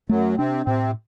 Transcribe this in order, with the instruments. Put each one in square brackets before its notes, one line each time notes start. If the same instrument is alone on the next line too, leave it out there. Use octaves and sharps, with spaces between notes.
[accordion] F#2 F#3 [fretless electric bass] A3
[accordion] C3 C4 [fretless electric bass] D4
[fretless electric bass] A2 [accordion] C3 C4